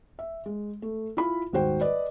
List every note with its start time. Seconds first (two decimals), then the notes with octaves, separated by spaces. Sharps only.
0.19 E5
0.46 G#3
0.82 A3
1.17 E4 F4 B5
1.53 D#1 G#2 F#4 C5 G5
1.81 B4 D5 D#5